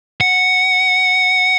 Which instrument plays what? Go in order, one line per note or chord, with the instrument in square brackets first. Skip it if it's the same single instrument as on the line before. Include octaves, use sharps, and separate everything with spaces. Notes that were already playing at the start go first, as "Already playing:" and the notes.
[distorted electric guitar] F#5